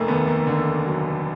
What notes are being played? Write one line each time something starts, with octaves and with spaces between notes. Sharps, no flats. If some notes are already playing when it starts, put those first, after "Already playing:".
Already playing: F1 A3 A#3
D#2 B3
A#3
D3
F#3